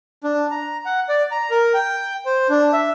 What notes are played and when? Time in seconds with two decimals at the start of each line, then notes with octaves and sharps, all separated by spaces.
0.24 D4
0.51 A#5
0.85 F#5
1.09 D5
1.31 A#5
1.50 A#4
1.74 G5
2.25 C5
2.49 D4
2.73 E5